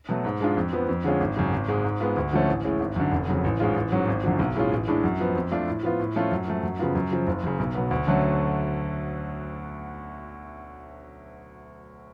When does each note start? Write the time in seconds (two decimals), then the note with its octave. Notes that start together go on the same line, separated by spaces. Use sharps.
0.09 B2 F#3 A3
0.25 G#2
0.41 G#3 D4 F4
0.57 F2
0.73 F3 B3
0.89 F2
1.04 D3 G#3 C#4 F4
1.20 G#1
1.37 F#2 C#3
1.52 G#1
1.68 G#2 G#3
1.84 G#2
2.00 G#3 B3 F4
2.16 D2
2.33 D3 F3 A3 C#4
2.48 A1
2.64 A2 G#3 C#4
2.80 G#1
2.96 F#2 D3
3.12 F1
3.28 F2 C#3 F#3
3.44 A1
3.60 G#2 G#3 C#4 F4
3.76 A1
3.92 G#2 F#3 C#4
4.08 G#1
4.24 F#2 D3 F3
4.39 B1
4.55 A2 G#3 C#4 F4
4.72 A1
4.88 A2 G#3 D4
5.04 F#2
5.20 F3 B3
5.35 F2
5.51 F3 A3 D4 F4
5.68 A2
5.83 F3 B3 F4
6.00 A2
6.16 F3 A3 C#4 F4
6.32 F#2
6.48 F3 A3
6.63 F#2
6.79 C#3 F3 B3 F4
6.95 F#2
7.11 C#3 F3
7.27 F#1
7.43 F#2 C#3
7.60 B1
7.75 B2 F#3 B3
7.91 D2
8.07 D3 F#3 A3 C#4